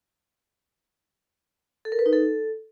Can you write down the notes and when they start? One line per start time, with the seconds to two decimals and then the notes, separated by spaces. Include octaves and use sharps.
1.85 A4
1.92 A#4
1.99 B4
2.06 D#4
2.13 A4